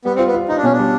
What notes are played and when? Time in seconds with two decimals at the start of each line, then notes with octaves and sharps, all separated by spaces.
0.05 G3 B3
0.15 C4
0.19 F4
0.27 B3
0.34 F4
0.49 D#4 F4
0.57 D4
0.63 B2 C#4
0.73 D4
0.79 G3